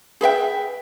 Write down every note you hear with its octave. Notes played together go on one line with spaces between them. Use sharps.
G#4 B4 E5 G5